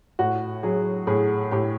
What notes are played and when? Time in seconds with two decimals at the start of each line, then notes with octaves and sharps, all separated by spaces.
0.19 A2 F#4
0.63 F#3 G#4
1.07 A2 G#4
1.51 A2 G4